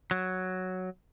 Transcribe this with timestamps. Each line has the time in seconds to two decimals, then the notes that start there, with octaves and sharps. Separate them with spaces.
0.11 F#3